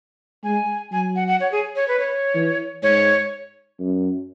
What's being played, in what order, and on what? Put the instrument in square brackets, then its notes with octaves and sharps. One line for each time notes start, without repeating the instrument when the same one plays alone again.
[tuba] G#3 [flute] G#5
[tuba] F#3 [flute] G#5
[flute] F#5
F#5
C#5
G#4
C#5
B4
C#5
[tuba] E3
[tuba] G#2 [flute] C#5
[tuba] F#2